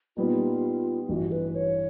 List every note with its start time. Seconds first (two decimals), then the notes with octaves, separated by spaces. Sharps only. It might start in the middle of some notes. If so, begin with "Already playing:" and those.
0.16 A#2 G3 B3 D#4 F4
1.09 A1 G2 E3 F#4
1.32 B4
1.55 C#5